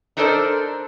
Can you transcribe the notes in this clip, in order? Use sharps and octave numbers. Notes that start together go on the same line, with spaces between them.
D4 D#4 A4 A#4 C5 D5